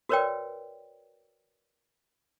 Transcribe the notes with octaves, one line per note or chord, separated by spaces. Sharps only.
F#4 A#4 B4 C#5 D5 G5